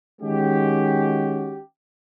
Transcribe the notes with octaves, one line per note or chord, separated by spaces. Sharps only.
D#3 G#3 C#4 F#4 G4